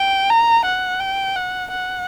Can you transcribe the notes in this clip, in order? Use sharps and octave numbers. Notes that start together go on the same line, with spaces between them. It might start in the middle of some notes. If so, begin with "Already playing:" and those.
Already playing: G5
A#5
F#5
G5
F#5
F#5